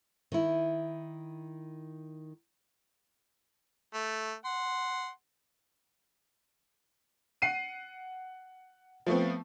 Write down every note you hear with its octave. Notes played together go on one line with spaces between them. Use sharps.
D#3 E4
A3
F#5 C6
F#5 C7 D#7
F3 A3 B3 C4